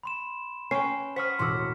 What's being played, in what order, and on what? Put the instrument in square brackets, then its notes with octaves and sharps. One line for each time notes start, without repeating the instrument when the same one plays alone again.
[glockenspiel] B5 C6 E7
[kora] C#4 [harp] B4 G5 [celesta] C7
[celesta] C5 [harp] F#5 C#6 D#6 [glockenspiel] F6 B6
[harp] E1 A2 F#4 [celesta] C6 D6 E6